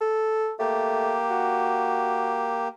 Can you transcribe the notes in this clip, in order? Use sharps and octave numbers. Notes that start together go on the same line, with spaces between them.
A4
A3 A#3 G4
F#4